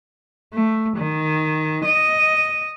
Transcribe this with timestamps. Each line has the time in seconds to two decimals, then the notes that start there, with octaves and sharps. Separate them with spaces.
0.54 A3
0.97 D#3
1.84 D#5